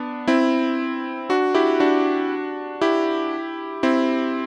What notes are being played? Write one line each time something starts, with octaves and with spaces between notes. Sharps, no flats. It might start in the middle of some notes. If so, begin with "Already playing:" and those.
Already playing: B3 D4
C4 E4
D4 F#4
E4 G4
D4 F#4
E4 G4
C4 E4